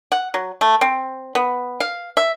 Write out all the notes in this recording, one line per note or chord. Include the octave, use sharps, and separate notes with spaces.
F#5
F#3
A3
C4
B3
F5
E5